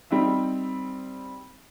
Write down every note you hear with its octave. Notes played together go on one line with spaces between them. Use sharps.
G3 C4 D#4 E5